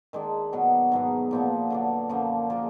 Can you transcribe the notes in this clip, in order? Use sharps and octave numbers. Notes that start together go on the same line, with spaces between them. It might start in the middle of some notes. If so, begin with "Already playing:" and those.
D#3 G#3 D4
B2 F#3 B3
G#2 F#3 B3
A#2 F3 B3
D3 F#3 D4
F#2 D3 F3 A#3
F3 A#3 F4 G#4